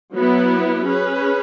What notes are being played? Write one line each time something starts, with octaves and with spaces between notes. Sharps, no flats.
F#3 B3 E4 B4
C#4 G#4 B4